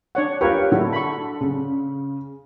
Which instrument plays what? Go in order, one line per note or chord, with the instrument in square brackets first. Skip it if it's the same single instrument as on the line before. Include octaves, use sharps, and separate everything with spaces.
[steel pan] D4 C#5 F#5
[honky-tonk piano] F4 G4 [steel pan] A#4 B4 C#5
[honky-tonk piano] D3 [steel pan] E4 F#4
[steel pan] B5 C#6
[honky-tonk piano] C#3